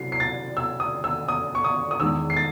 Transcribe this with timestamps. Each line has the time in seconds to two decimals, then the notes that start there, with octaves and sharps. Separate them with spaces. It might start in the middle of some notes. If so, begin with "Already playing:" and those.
Already playing: C3 F#3 E4 C7
0.12 C7
0.20 A6
0.57 E6
0.80 D#6
1.04 E6
1.29 D#6
1.55 C#6
1.64 D#6
1.91 D#6
2.00 E2 D#3 G#3 E6
2.30 C7
2.36 A6